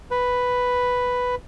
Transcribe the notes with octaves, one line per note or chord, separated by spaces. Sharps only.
B4